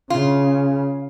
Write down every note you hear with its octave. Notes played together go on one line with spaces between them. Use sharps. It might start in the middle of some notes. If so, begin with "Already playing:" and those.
C#3 F4